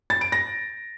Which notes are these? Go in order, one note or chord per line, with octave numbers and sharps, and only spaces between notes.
A6
D7
A#6